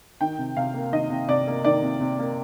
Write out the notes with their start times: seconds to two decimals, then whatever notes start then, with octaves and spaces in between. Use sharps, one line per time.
0.21 D#3 G5
0.39 C3
0.57 C3 F5
0.74 A#3
0.93 D#3 D#5
1.10 C3
1.29 C3 D5
1.47 A#3
1.65 D#3 D5
1.82 C3
2.01 C3
2.19 A#3